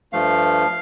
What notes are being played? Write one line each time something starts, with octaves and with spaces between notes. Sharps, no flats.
G2 F3 A3 F5